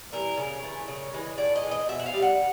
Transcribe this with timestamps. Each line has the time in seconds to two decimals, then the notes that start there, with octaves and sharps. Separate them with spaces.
0.12 E3 G3 A#4
0.37 C#3
0.63 E3 A3
0.88 C#3
1.14 E3 G#3
1.38 A2 D5
1.56 D#5
1.63 E3 G#3
1.71 D#5
1.89 B2 E5
1.99 F#5
2.06 F5
2.14 G3
2.22 F#5